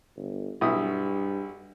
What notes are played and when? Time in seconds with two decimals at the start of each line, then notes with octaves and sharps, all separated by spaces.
0.17 G1
0.61 B1 G2 E4 D#6